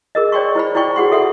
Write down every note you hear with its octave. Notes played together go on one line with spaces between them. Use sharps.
G#4 A#4 D#5
C#5 D5 G5 C6 C#6
E4 C5 B5
E4 C5 D5 G5 C#6
F#4 G#4 F#5 C6
A4 E5 F#5 C6